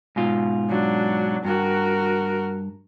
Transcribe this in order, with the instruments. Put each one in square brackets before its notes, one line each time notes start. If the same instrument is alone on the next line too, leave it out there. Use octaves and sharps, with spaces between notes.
[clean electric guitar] G#2 B2 F4
[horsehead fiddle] F#3 D4
[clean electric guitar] G2 [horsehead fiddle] F#4 A#4